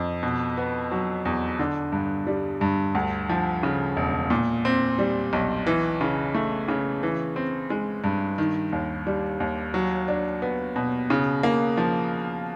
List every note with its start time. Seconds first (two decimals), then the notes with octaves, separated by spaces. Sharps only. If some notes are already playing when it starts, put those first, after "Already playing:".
Already playing: F2
0.23 B2
0.57 B3
0.91 F#3
1.25 E2
1.59 D3
1.92 G2
2.27 G3
2.61 G2
2.95 D2
3.29 F3
3.63 C#3
3.97 E1
4.30 A#2
4.65 C4
4.99 G3
5.33 B1
5.67 E3
6.01 C#3
6.35 A3
6.68 C#3
7.03 E3
7.36 C4
7.70 G#3
8.04 G2
8.38 D#3
8.73 D#2
9.07 G3
9.40 D#2
9.74 F#3
10.08 D4
10.42 B3
10.76 B2
11.10 C#3
11.43 A#3
11.77 F3